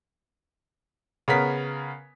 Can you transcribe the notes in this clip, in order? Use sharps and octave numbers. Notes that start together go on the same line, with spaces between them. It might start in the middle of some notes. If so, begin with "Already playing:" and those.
C#3 B3 A#4 B6